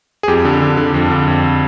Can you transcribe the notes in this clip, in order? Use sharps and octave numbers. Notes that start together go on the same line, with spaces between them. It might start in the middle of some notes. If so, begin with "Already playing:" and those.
G#4
F2 G4
D3
D3
D3
F2
D3
F2